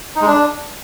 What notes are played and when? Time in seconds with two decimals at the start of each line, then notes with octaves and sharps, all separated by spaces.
0.16 D#4
0.21 G#3
0.27 D4